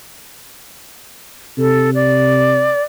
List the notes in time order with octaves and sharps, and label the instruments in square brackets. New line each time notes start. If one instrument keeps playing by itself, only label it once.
[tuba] C3 [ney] A4
[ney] D5